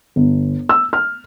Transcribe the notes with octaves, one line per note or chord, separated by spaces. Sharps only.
G1
E6
F6